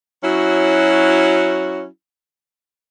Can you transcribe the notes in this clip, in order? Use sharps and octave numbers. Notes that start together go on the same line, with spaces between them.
F#3 C#4 E4 F#4